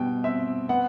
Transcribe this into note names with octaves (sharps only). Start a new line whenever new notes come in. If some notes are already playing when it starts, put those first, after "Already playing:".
Already playing: B2 G3 G5
C4 E5
B3 F#5